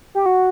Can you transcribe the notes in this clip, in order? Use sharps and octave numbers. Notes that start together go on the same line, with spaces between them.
G4
F#4